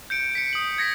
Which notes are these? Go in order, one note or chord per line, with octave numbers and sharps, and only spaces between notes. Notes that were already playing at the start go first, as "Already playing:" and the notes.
G6 C#7 D7
B6 C#7
D#6 F#7
G#6 A#6 B6 C#7